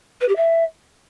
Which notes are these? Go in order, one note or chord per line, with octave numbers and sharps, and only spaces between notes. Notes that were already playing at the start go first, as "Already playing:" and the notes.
B4
G4
E5